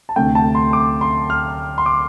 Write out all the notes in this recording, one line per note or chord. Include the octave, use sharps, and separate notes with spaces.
A5
D2 C3 A3 G5
A5
C6
D6
C6
F6
C6
D6